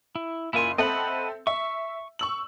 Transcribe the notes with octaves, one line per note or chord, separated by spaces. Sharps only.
E4
F#1 A#3 E4 F4 G#5 C6
C4 A4 D#5 E5 F#5 B5
E5 C#6
C#6 E6 F#7